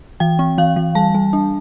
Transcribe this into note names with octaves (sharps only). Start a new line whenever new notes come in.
E3 G5
C4
E3 F5
E3
G3 A5
G3
D4